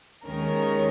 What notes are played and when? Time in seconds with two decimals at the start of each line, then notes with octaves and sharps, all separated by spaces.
0.24 D#2 D#3 G#3 C#4 A#4